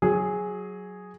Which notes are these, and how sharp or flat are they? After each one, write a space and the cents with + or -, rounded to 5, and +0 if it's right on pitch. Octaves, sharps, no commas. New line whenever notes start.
F#3 +0 G#4 +0